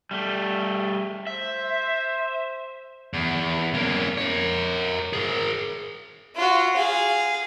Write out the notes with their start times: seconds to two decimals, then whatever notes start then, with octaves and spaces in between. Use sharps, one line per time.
0.11 G3 A3
1.27 C5 E5
3.13 E2
3.75 A#3 C#4
4.18 A#4 C#5
5.13 G#4 A#4
6.35 F4 F#4
6.76 G#4 F5